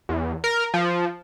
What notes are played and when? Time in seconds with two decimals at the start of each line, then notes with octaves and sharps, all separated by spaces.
0.09 E2
0.44 A#4
0.74 F3